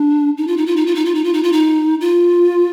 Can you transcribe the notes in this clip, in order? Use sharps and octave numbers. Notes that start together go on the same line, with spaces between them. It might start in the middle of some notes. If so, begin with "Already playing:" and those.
Already playing: D4
D#4
F4
D#4
F4
D#4
F4
D#4
F4
D#4
F4
D#4
F4
D#4
F4